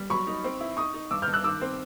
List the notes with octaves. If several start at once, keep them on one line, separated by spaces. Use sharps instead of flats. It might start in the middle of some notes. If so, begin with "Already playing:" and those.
Already playing: G3
F#3 B5 C#6
D#4
C4
E4
D#4 C#6 D#6
D#4
G2 D6 E6
F6 G6
G2
E6 F#6
D#3 D6 E6
C4